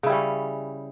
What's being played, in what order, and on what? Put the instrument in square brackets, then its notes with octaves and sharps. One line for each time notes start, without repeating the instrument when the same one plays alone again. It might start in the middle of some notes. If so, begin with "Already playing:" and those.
[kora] C#3
E4
G3
C#4